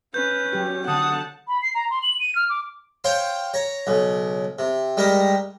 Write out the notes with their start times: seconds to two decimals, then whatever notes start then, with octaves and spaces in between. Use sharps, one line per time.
0.14 C#4 B4 G6
0.53 F#3 G4
0.88 D3 F#5 A5 D#6
1.48 B5
1.62 C7
1.74 A#5
1.90 C6
2.03 F#7
2.19 D#7
2.35 F6
2.49 D6
3.04 C5 C#5 F5 G5 C6
3.54 C#5 A#5
3.87 B1 C#3
4.59 C3
4.97 G3 G#3 G4 A#4